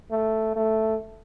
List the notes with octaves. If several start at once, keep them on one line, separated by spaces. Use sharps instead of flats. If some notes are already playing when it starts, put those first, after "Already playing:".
A3
A3